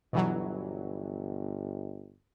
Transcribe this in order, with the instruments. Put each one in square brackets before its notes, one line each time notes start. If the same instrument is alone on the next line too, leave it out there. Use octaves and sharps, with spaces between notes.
[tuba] G1 [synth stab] B2 E3 F#3